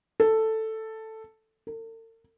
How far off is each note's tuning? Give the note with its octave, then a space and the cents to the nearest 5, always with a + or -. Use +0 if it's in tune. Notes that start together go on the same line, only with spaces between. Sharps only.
A4 +5
A4 +45